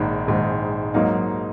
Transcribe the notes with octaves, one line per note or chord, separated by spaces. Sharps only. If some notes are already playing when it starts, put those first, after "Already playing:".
Already playing: A#1 G#2 D#3
A#1 G#2 D#3
G#2 F#3 A#3 D#4